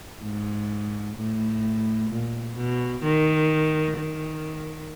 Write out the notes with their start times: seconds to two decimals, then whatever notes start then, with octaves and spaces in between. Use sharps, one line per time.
0.22 G#2
1.16 A2
2.10 A#2
2.56 B2
3.03 D#3
3.97 D#3